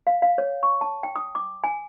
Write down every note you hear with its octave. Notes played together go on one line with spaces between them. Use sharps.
F5
F5
C#5
C#6
A5
G5
D#6
D6
G#5